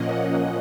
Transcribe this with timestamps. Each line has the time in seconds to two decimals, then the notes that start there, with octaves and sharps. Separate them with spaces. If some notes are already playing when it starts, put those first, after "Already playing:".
Already playing: A#2 F3 A#3 C#4 D#5 F#5